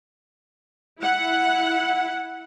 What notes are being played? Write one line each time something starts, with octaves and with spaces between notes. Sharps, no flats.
E4 F#5